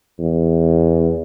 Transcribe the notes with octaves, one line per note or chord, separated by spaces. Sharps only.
E2